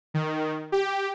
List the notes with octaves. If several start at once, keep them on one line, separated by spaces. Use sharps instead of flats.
D#3
G4